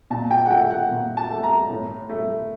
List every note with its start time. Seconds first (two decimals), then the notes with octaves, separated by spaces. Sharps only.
0.10 A#2 A5
0.31 G5
0.45 F#5
0.50 A3 G5
0.71 F#5
0.91 A#2
1.17 A5
1.30 A3
1.43 A#5
1.70 A2
2.09 A3